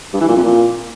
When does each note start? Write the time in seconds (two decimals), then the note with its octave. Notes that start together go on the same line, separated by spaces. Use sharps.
0.13 G2
0.21 E3
0.29 A#2
0.36 F2
0.44 A#2